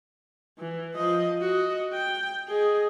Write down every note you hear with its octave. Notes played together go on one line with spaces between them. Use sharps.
E3
F3 D#5
F#4 D#5
G5
G#4 D#5